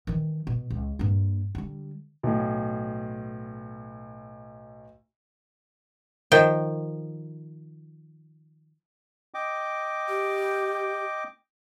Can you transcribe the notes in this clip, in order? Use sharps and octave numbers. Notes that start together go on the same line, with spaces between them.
D#3 E3
B2
C#2
G2 A#3
D3 G3
B1 A2
D#3 F3 G5
D#5 G5 D6
G4